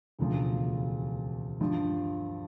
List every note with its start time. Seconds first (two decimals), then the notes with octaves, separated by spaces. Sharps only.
0.19 E1 D2 C#3 F3
1.60 G2 D3 F3